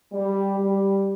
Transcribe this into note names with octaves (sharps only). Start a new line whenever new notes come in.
G3
G3